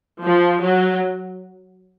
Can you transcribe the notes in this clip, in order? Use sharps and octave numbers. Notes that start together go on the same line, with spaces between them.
F3
F#3